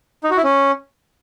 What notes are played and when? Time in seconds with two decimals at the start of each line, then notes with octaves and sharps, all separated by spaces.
0.24 D#4
0.30 F#4
0.37 E4
0.44 C#4